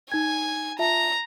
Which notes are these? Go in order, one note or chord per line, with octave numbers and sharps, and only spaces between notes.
D#4 G#5 G#6
F4 E5 A5 A#5